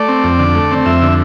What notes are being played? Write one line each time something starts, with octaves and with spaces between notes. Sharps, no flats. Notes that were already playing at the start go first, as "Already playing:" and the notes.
Already playing: A3 D5
C4
F2
D3
A3
C4
F2 E5
D3